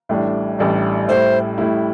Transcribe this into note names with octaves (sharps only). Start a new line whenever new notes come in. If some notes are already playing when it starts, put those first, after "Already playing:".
A1 A2 G3 D4
A1 A2 G3 D4
A2 G3 E4 C5
A2 G3 E4